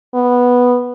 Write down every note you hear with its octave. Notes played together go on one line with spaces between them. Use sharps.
B3